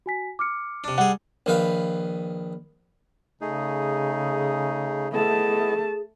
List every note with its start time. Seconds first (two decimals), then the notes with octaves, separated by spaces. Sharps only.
0.06 F#4 G#5 B6
0.39 D6 F6 C#7
0.84 C3 D4
0.98 G3 G#4 F#5
1.46 A#1 D#3 B4 F5
3.41 C#3 A3 D#4 G#4
5.12 A3 B3 E4 G#4 D#5 A5